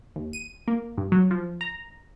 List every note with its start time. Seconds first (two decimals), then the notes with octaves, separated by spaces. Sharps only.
0.16 D#2
0.33 D#7
0.68 A#3
0.98 G2
1.12 F#3
1.31 F3
1.61 A#5